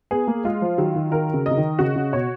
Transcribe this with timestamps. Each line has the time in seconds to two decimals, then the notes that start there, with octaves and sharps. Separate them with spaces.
0.11 B3 G#4
0.27 A#3
0.44 G#3 F4
0.62 F3
0.78 D#3 F#3
0.95 D#3
1.11 D#3 A#4
1.34 C#3
1.46 D#5
1.51 C#3
1.57 D#3
1.79 C#3 F#4
1.96 C#3
2.13 B2 C#5